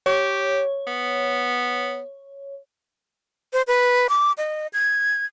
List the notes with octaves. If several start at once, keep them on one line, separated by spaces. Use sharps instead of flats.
G4 C#5
B3
C5
B4
D6
D#5
G#6